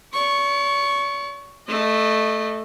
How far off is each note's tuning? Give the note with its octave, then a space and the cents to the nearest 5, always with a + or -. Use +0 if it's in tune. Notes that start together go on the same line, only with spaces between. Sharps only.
D5 -45 C#6 +0
A3 +0 D#5 -25